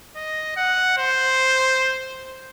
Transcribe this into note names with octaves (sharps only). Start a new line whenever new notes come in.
D#5
F#5
C5